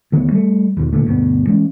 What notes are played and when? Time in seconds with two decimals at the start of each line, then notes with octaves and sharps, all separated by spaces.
0.12 D2 D#3 A3 B3
0.32 G3 A3
0.77 D#2 B2 D#3
0.93 A#2 D3 A3
1.06 D2 G2 B2 B3
1.47 E3 G#3 C#4